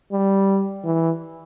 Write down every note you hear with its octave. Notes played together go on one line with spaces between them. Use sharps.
G3
E3